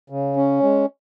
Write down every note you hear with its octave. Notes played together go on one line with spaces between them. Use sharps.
C#3
C#4
G#3